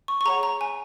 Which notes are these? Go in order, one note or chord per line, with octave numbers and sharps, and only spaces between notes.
C#6
C#6
G#4 C#5 F#5 A#5
A#5
G#5